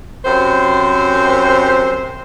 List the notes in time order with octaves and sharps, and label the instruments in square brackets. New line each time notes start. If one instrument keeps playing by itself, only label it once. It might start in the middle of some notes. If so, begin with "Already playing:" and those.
[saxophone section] F#2 C3 C5